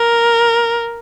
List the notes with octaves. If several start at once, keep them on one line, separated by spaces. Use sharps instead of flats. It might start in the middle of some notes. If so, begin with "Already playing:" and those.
Already playing: A#4